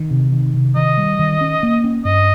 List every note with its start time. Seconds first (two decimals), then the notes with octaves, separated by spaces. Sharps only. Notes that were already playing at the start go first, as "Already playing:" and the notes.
Already playing: D#3
0.11 C3
0.32 D#3
0.54 C3
0.76 D#3 D#5
0.98 G3
1.19 D#3
1.41 C#4
1.63 A#3
1.84 C#4
2.05 G2 D#5